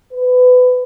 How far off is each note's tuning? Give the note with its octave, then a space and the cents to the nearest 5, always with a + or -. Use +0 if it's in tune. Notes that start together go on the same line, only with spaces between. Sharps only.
B4 +20